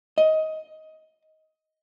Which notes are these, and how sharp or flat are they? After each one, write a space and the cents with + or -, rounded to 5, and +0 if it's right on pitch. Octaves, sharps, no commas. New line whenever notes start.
D#5 +15